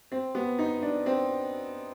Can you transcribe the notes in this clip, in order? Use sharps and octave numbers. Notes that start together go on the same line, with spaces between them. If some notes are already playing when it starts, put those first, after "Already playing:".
C4
B3
D#4
D4
C4